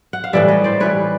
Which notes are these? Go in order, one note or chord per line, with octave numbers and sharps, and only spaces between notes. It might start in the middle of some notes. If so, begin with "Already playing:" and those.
F#5
F5
A2 E3 G3 D5 E5
C#5 D#5
C5 D5
A2 E3 G3 B4 C#5